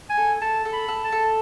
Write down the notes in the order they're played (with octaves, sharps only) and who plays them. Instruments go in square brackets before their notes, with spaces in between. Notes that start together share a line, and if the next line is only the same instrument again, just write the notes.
[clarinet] G#5
[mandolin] A4
[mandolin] A4 [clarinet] A5
[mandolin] A4
[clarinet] B5
[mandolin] A4
[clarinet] A5
[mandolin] A4